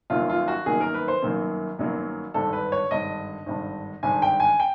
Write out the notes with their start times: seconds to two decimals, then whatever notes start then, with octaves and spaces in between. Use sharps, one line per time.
0.10 G1 F#2 D#3 F#3 A#3 F4
0.29 F4
0.48 F#4
0.66 G1 F#2 D#3 F#3 A#3 G#4
0.80 A#4
0.94 B4
1.08 C5
1.22 G1 F#2 D#3 F#3 A#3
1.78 G1 F#2 D#3 F#3 A#3
2.34 G#1 G2 D3 A4
2.53 B4
2.72 C#5
2.91 G#1 G2 D3 D#5
3.46 G#1 G2 D3
4.03 G#1 G2 D3 G#5
4.22 G5
4.40 G#5
4.60 G5